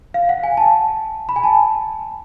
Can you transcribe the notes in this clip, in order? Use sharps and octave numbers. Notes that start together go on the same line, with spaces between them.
F5
F#5
G#5
A5
B5
G#5
A5